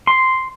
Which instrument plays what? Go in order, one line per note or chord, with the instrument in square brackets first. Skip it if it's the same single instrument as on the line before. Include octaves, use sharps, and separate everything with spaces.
[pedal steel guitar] C6